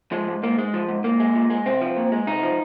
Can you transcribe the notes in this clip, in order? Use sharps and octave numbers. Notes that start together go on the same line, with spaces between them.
F3 G#3
G#2
G#2 A#3
G#3
F3
G#2
G#2 A#3
G#3
A#2
G#3
C2 C4
F3
A#2
G#3
C2 D#4
F3